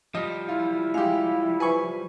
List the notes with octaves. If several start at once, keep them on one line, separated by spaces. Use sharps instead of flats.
F3 G3 D#5
E4 F4
G#3 G4 F5
B4 C5 G#5 B5 C#6